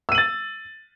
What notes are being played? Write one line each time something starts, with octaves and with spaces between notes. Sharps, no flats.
E6 A6 D#7 F#7